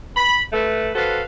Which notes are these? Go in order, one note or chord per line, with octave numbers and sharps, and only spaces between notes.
B5
A3 B4
F#4 A4 B4 C5 F5